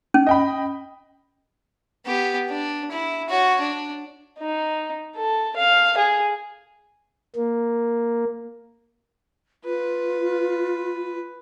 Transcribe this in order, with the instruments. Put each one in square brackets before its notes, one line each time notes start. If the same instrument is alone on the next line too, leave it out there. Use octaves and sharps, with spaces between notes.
[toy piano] C#4
[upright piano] D#5 G5 B5
[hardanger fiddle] B3 G4
D4
E4
F#4 C#5
D4
D#4
A4
F5
G#4
[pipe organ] A#3
[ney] F4 [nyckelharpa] B4